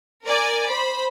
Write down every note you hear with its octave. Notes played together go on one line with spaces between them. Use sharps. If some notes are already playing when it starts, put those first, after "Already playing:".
A#4 D5 G#5
C5 B5